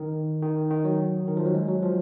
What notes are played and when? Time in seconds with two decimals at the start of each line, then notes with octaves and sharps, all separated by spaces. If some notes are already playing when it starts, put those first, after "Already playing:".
Already playing: D#3
0.42 D#3
0.71 D#3
0.84 F#3
1.28 D#3
1.37 F3
1.46 F#3
1.54 G#3
1.68 F#3
1.82 F3